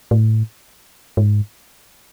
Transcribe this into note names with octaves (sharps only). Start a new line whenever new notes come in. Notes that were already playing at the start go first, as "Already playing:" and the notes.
A2
G#2